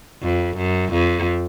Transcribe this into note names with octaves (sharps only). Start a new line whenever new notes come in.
F2
F#2
F2